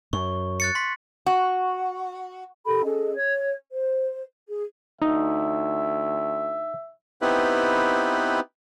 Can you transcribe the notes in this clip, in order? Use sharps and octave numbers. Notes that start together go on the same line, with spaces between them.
F#2 C#6
F#6 A6 C#7
C6 B6
F#4
G4 A4 A#4 B5
C#4 G#4 A4 D#5
C#5 G#6
C5
G#4
D2 D#4 E5
B3 C4 D#4 E4 G4 B4